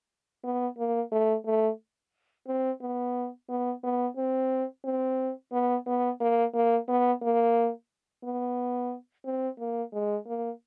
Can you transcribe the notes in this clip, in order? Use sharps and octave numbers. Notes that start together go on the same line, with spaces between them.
B3
A#3
A3
A3
C4
B3
B3
B3
C4
C4
B3
B3
A#3
A#3
B3
A#3
B3
C4
A#3
G#3
A#3